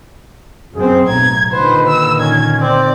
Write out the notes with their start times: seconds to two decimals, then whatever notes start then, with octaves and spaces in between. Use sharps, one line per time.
0.75 F#2 C4 G#4
1.08 B1 A2 A#5 G#6
1.52 A#2 D3 D#3 B4 C5
1.88 E6
2.20 C#4 G#6
2.61 C4 D5